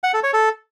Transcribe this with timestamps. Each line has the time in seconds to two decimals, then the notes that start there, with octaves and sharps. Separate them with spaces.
0.04 F#5
0.13 A4
0.23 C#5
0.33 A4